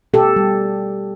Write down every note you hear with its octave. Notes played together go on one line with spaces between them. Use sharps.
B2 G4 A4
G3